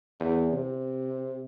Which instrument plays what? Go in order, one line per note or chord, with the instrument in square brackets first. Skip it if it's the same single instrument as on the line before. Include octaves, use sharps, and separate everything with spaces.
[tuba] E2
C3